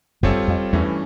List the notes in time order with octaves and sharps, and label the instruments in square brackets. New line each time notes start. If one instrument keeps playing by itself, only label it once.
[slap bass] F#1 F#2 [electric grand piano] G3 C4 F4 A4 C#5
[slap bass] F2
[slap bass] E2 [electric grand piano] G2 E3 A3 C#4